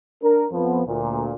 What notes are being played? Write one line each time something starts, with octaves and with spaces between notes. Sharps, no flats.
D4 A#4
F2 F3 B3
D2 A#2